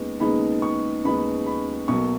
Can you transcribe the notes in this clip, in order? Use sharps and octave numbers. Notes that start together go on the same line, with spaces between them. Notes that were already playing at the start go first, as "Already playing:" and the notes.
Already playing: D#2 C#3 G#3 B3 D#4
D#2 C#3 G#3 B3 D#4 B5
C#6
D#2 C#3 G#3 B3 D#4 B5
B5
B1 B2 F#3 A#3 C#6